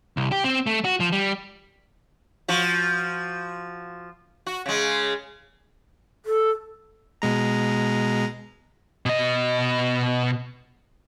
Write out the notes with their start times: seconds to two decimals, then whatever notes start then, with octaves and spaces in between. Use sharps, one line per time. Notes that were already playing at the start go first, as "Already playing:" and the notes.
0.17 C2
0.32 G4
0.44 C4
0.66 A3
0.84 F#4
1.00 F3
1.12 G3
2.48 F3 F#4
4.47 F#4
4.66 C#3 G#3
6.26 A4
7.22 B2 G#3 A#5
9.06 B2 D#5